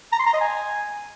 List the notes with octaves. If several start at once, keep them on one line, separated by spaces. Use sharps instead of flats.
A#5
C6
A#5
D#5
G#5